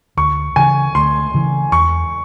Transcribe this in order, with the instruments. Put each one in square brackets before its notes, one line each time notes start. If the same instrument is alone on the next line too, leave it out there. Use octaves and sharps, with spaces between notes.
[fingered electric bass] D2 [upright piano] C#6
[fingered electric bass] C#3 E3 [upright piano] G#5
[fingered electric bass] D2 [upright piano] C6
[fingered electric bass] C#3 E3
[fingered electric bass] E2 [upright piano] C#6